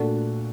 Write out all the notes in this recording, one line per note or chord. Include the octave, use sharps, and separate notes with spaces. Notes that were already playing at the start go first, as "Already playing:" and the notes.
Already playing: A#2 A3 D4 F#4